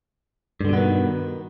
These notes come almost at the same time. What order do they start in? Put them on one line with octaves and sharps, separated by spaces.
G2 D3 B2 B3 D#3